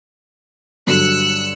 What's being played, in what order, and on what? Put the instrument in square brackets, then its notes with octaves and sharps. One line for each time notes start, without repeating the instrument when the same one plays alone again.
[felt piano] G2 D3 F#3 [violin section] E6 F#6 C#7